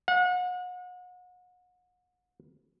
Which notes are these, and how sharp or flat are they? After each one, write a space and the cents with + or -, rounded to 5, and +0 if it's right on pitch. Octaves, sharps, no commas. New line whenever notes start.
F#5 -35